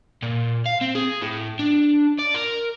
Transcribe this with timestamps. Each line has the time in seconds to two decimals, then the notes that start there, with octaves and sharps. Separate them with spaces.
0.22 A#2
0.66 F5
0.81 C4
0.95 G#4
1.22 A2
1.59 D4
2.19 D5
2.34 A#4